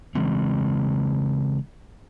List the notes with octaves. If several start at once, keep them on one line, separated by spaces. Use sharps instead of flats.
C#3 E3 G#3 C4